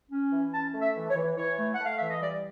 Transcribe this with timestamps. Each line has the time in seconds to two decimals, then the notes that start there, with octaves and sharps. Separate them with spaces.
0.11 C#4
0.32 E3
0.53 C#4 A5
0.74 A3
0.81 E5
0.96 E3
1.10 C#5
1.16 E3
1.37 E3 C#5
1.59 A3
1.75 F#5
1.80 A3
1.85 F5
1.99 E3 E5
2.10 D#5
2.22 G3 D5